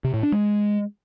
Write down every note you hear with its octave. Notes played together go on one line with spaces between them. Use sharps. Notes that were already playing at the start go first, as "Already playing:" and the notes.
C3
A2
D4
G#3